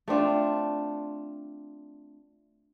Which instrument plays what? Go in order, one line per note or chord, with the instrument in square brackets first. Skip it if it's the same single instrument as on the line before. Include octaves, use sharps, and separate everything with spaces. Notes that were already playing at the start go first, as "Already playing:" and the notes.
[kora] A3 C4 D4 F4